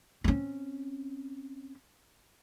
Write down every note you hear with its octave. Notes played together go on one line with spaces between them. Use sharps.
C4 C#4